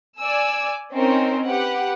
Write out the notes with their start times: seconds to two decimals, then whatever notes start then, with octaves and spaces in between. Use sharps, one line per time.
0.20 D5 G#5 E6
0.93 C4 C#4 D#4 A#4 C5
1.46 G4 B4 F#5